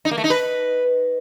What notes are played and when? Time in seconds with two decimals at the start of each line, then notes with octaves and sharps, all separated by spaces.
0.05 D#4
0.11 A#3
0.18 A3
0.24 D#4
0.30 B4